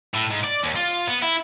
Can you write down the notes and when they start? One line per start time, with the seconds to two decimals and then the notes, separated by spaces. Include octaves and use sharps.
0.14 A2
0.30 G#2
0.44 D5
0.63 D#2
0.76 F4
1.07 B3
1.22 E4